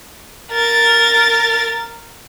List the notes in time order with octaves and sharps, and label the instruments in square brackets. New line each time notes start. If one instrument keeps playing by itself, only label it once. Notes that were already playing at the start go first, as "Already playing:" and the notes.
[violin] A#4 A6